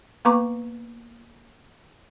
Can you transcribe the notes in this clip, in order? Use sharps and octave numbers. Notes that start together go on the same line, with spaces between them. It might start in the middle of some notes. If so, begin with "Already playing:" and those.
A#3 B3 B4 A#5 C#6 D6